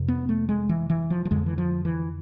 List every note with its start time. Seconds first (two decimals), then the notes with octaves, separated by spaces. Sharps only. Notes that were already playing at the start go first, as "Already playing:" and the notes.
Already playing: F2 C3
0.08 B3
0.29 A3
0.49 G#3
0.69 E3
0.90 E3
1.10 F3
1.25 F3
1.31 F2 D3 G#3
1.46 E3
1.58 F3
1.85 E3